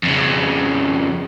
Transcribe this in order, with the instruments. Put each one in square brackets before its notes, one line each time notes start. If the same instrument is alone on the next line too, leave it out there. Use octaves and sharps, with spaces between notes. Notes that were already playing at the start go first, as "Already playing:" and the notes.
[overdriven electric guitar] F2 C#3